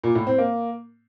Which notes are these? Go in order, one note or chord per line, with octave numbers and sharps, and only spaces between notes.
A#2
A2
C4
A#3